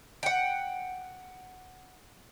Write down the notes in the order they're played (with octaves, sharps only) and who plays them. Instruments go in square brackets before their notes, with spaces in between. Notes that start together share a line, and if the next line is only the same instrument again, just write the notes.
[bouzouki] F#5 G5